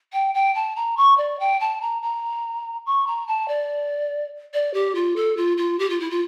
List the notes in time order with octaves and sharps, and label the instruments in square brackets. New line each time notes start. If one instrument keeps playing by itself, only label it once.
[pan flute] G5
G5
A5
A#5
C#6
D5
G5
A5
A#5
A#5
C#6
A#5
A5
D5
D5
G4
F4
A4
F4
F4
G4
F4
E4
F4